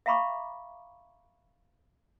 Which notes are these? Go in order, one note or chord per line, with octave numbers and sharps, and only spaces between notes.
E5 F5 A#5 B5 C#6 D6